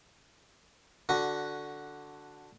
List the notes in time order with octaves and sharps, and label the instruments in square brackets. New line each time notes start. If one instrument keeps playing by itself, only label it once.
[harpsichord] D3 F#4